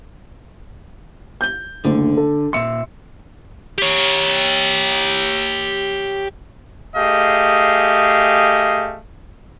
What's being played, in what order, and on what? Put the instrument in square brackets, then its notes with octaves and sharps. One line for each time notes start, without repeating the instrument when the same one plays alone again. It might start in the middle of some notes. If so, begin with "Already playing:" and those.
[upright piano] G6 G7
[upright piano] F#1 D2 [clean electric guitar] D3
[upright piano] A4
[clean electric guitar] A#2 E5 C6 [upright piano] C#7
[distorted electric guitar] G4 C#5
[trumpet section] A3 G4 G#4 D#5 F5